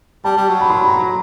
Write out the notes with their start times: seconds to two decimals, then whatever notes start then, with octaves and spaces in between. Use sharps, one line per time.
0.24 G3 A5
0.37 G3
0.49 F#3
0.61 B5
0.70 C6
0.79 B5
0.88 A#5